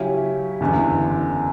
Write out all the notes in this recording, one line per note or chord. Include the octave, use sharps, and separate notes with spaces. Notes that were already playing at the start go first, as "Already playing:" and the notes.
Already playing: C#3 F#3 C#4 E4 G4
F#1 E2 D3